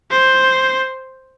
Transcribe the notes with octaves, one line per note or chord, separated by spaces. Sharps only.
C5